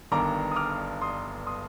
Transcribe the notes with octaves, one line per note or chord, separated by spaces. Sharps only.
G1 G2 D#3 A#5 D6
D#6
D6 F6
C6 D#6
C6 D#6